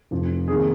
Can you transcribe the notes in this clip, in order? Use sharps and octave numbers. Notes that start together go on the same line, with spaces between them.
F1 F2 F3
F2 C3 D#3 A#3 G#4